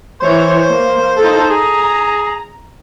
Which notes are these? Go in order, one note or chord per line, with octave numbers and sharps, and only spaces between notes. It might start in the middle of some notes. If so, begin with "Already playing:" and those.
E3 C5 C#5
A#3
D#4 F4 A4
G#4 A#5